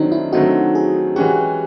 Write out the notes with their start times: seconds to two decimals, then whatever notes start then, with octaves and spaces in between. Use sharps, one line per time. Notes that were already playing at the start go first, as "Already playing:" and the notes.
Already playing: D#3 F#3 A3 C4 D4 D#4
0.12 E4
0.33 D#3 F#3 A3 C4 D#4 F#4
0.75 G#4
1.16 E3 G#3 C#4 F#4 G4